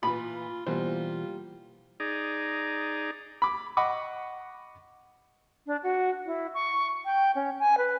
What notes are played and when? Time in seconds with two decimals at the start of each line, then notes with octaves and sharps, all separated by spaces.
0.03 A#2 E3 F4 B5
0.67 B2 E3 G3 A#3 F4 C5
2.00 D#4 G#4 D5 A#5
3.42 B5 D6
3.77 D#5 F#5 B5 C#6 D6
5.67 D4
5.83 F#4
6.26 E4
6.54 C#6
7.05 G5
7.35 C#4
7.59 G#5
7.78 B4